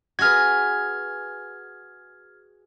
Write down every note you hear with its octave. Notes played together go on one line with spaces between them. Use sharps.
F#4 G#4 B4 F6 G#6